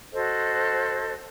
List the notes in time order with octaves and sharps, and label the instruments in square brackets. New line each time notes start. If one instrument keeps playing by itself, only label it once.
[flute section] F#4 A4 C5 D#5